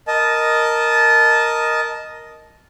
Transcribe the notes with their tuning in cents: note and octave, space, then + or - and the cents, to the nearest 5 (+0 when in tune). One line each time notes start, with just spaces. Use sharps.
A#4 +0 D#5 +0 A5 -15